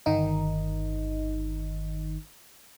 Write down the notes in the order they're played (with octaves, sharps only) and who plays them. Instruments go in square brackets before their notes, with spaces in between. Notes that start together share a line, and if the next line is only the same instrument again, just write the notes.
[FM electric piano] G1 D#3 D#4